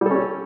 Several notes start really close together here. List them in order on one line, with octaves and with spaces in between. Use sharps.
G3 A4 C#4